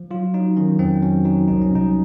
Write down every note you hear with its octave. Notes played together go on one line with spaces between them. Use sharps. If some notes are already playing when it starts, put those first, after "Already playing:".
Already playing: F3
F#3 F4
F#3 D#4
D#3 C#4
F2 C4
F#3 C#4
F#3 D#4
C2 D#4
C#4
C2 D#4